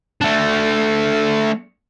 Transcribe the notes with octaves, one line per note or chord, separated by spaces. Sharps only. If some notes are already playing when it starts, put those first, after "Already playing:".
A3 D4